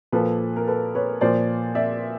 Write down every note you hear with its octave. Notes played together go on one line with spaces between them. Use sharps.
A#2 F3 A4 B4
A#4
A4 B4
B4 C#5
A#2 F3 C5 D5
D5 E5